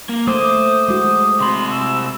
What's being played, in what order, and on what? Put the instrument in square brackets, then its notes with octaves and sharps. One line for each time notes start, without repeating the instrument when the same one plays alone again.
[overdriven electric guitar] A#3
[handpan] A3 [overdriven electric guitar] C5 [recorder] D6 [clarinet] D#6
[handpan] G#3 F#4 [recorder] D6
[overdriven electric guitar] C3 B5 [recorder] C6
[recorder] E6